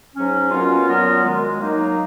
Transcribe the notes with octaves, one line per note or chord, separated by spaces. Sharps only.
G#2 F#3 C#4
B2 A#3 C#4 F4
A#2 F#3 B3 F4 A#4
F#2 D#3 G#3
D#3 F#3 A#3 D#4